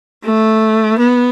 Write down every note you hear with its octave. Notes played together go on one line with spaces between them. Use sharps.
A3
B3